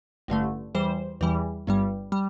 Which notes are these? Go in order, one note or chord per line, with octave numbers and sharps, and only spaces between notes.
A1 G2 D3 A3
E2 E3 G3 C5
E2 E3 G3
G1 G2 G3
G3